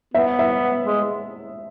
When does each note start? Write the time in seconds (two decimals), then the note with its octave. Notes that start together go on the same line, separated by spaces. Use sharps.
0.14 B3 E5
0.39 E5
0.85 G#3